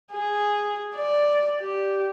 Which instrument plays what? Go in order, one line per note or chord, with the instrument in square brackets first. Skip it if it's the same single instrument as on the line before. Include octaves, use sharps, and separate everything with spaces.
[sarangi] G#4
D5
G4